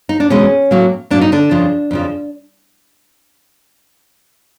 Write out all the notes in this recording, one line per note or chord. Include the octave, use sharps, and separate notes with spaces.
D#4
D4
E2 B2 G#3 C4 C#4
A2 F#3 A#3
A2 F#3 A#3 D4
D#4
D3 D4
F2 C#3 F3
F2 C#3 F3